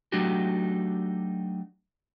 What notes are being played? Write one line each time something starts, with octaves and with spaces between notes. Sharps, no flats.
F#3 A3 D4 D#4 F#4 G4